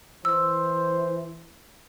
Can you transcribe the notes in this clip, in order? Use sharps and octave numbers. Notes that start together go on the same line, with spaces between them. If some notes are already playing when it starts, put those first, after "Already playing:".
E3 C5 E6